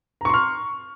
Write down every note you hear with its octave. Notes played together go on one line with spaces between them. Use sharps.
A#5 C6 C#6 F6